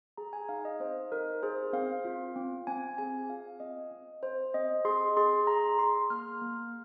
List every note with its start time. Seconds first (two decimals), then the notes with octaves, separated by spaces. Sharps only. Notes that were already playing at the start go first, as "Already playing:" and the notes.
0.17 G#4 A#5
0.33 G#5
0.49 D#4 F5
0.65 D#5
0.80 C4 C5
1.12 D#4 A#4
1.43 G#4 C5
1.73 C4 F5
2.05 F4
2.36 C4
2.67 C4 G#5
2.98 G#4 G#5
3.30 F4 F5
3.60 C4 D#5
3.91 C4
4.23 C4 C5
4.54 C4 D#5
4.85 G#4 C6
5.17 G#4 C6
5.47 G#4 A#5
5.78 G#4 C6
6.10 A#3 F6
6.41 A#3